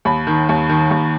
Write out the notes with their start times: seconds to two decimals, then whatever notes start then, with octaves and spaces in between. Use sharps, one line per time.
0.05 D#2 B5
0.27 D#3
0.49 D#2
0.69 D#3
0.91 D#2